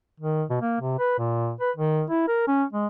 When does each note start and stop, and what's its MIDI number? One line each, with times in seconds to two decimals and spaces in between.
0.20 0.43 51
0.50 0.57 47
0.62 0.78 58
0.81 0.98 48
0.99 1.15 71
1.18 1.53 46
1.61 1.71 71
1.77 2.04 51
2.10 2.26 64
2.28 2.46 70
2.48 2.64 61
2.73 2.87 56